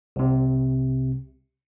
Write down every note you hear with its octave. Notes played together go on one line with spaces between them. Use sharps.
C2 C3